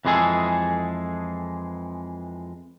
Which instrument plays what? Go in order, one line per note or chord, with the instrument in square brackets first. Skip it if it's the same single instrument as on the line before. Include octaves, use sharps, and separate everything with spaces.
[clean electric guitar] F2 E3 G#3 C4 G#4 A4